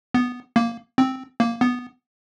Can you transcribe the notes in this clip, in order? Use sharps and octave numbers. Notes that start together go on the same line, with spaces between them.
B3
A#3
C4
A#3
B3